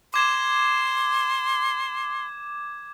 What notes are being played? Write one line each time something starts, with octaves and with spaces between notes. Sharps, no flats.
C6 D6 G#6 E7